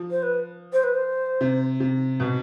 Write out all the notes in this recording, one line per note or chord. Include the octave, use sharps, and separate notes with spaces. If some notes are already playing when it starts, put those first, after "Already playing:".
Already playing: F3
C5
B4
C5
B4
C5
C3
C3
B2